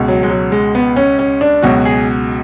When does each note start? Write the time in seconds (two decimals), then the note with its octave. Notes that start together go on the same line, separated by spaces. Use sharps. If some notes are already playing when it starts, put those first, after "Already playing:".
Already playing: C#2 B2
0.08 F#3
0.23 G#3
0.29 F#3
0.52 G#3
0.75 B3
0.96 C#4
1.19 C#4
1.41 D4
1.63 C#2 B2 F#3 F#4
1.85 G#4